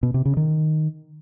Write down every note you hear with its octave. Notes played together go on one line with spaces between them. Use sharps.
B2
C3
C#3
D#3